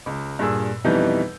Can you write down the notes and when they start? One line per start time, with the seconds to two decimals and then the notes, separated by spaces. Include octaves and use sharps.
0.06 C#2
0.39 G2 A#2 G#4 E6
0.84 F2 B2 E3 G3 D#4 G6